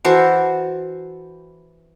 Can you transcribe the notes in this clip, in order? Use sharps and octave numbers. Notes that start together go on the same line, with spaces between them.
E3 F#4 A4 C5